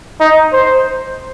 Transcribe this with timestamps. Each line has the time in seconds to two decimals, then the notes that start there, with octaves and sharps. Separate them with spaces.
0.20 D#4
0.53 C5